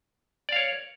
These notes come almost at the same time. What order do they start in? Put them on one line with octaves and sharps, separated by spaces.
D5 F5 C#5